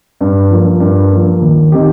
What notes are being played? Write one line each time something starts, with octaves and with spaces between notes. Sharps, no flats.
G2
F3 A#3
G2
F3 A#3
D#2
D#3 C4 D#4 G4